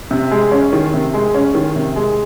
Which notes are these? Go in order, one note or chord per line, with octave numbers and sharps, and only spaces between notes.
C3
G#3
C#4
D#3
C3
G#3
C#4
D#3
C3
G#3